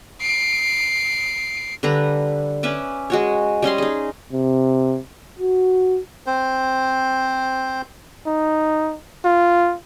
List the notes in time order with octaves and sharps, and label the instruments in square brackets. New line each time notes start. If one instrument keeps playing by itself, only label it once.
[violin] C7 D7
[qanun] D3 G3 B4 A#5
C#4 B4 E5 D6
G#3 F#4 C#5
G3 C#4 D#5 C6
D#4 G#4
[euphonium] C3
F#4
[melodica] C4 C5
[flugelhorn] D#4
F4